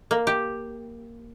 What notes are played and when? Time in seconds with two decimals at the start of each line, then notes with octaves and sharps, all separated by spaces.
0.11 A#3
0.27 G4